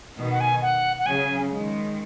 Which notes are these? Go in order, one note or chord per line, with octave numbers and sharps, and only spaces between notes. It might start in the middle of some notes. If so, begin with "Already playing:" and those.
B2 D#3
F#5
G#5
F#5
F#5
C#3 F#3 G#5
D#3 G#3